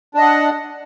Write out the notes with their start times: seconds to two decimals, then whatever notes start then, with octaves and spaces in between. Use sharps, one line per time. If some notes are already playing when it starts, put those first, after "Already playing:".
0.14 D4
0.18 D#5
0.22 F#5